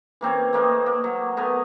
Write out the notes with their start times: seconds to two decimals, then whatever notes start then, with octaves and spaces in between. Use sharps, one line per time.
0.21 E3 A#3 C4 C#4
0.53 A3 A#3 C4 D#5
0.86 A#3
1.04 F#3
1.37 A3 B3 A#4 G#5